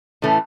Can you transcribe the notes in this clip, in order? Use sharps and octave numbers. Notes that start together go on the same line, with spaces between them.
A2 E3 A3 C#4